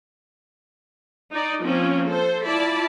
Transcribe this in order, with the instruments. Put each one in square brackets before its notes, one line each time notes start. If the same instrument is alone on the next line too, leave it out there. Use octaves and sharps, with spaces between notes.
[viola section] D#4 D5
F3 A#3 C4 C#4
A4 C5
E4 F4 D5 A5 B5